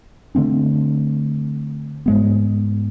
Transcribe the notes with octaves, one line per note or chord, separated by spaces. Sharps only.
D3 A3 C4 D4
G#2 G#3 B3